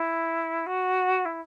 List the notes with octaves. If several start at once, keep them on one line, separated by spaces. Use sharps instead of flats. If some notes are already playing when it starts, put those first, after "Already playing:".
Already playing: E4
F#4
E4